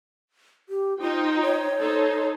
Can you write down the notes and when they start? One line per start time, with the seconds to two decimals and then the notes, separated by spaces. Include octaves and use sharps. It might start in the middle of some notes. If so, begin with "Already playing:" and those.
0.69 G4
1.00 D#4 F4 C5 G5
1.42 C#5
1.81 D#4 A4 C5